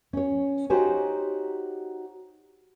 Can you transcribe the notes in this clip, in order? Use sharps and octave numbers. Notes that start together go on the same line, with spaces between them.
C#4 C#5
D#4 F#4 G4 C5 C#5 G#5